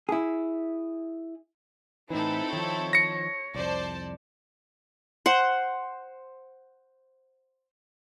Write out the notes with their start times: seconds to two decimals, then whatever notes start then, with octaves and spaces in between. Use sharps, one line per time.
0.09 E4 G#4
2.10 A2 E3 C4 D#4 E4 A4 B4
2.53 D#3 F3 C#5
2.93 A#6 C#7
3.54 C2 F2 C5 D5 A5
5.26 C5 F#5